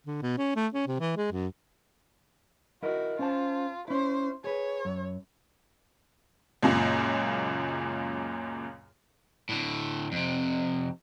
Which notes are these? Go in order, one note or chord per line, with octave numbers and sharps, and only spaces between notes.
D3
B2
C#4
A3
C#4
C3
E3
G#3
F#2
E4 F#4 A#4 D#5
C#4 F4 C5 A5
C#4 E4 C5
G#4 B4 C#5
F#2
C#2 F#2 A#2
A2 D3
F2 C3